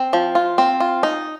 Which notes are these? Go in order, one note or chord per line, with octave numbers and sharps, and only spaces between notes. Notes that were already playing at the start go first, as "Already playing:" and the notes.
Already playing: C4
F3
F4
C4
F4
D#4